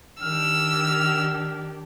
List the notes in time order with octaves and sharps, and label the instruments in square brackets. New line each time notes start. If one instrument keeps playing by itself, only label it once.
[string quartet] D#3 D4 G4 [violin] E6 [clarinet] F6